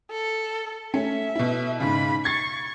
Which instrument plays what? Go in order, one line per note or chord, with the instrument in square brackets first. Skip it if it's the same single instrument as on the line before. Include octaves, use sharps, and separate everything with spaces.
[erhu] A4
[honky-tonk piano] A3 C#4 [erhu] E5
[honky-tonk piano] B2 E4
[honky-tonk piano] G#2 C#3 [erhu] B5
[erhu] C#6 [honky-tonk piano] G#6 A6 C7